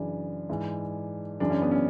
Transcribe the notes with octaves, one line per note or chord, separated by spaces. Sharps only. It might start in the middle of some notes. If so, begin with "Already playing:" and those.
Already playing: F#2 C#3 E3 D4
G#2 E3
F#2 C#3 E3 D4
C#4
B3
C#4